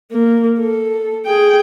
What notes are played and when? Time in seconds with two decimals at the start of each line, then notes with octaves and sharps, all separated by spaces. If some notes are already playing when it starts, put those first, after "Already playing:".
0.12 A#3
0.60 A4
1.26 G#4 G5